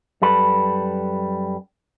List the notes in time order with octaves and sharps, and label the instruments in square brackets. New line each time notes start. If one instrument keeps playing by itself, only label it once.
[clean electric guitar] F#2 G3 A4 B4